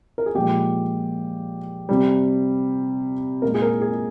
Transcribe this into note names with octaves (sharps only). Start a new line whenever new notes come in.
A#4
G#4
A#2 F3 G#3 G4
C3 G3
A#2 G#3 A#4
G#4
A#4
G#4